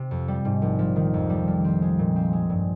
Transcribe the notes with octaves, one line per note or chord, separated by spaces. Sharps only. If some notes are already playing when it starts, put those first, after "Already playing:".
Already playing: C3 C4
F2
G3
G#2
A#1
F3
D#3
F2
G3
F3
C4
G#3
A#2
C4
G#3
G2